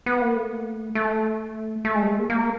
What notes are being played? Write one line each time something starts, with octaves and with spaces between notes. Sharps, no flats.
B3
A#3
A3
A3
A3
G#3
G3
G#3
A#3
A#3